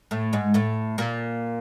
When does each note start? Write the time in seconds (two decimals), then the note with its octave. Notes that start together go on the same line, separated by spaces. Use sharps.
0.11 A2 A3
0.33 G#2 G#3
0.54 A2 A3
0.98 A#2 A#3